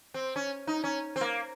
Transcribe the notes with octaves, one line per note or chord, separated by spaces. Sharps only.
C4
C#4
D#4
C#4
C4
A#3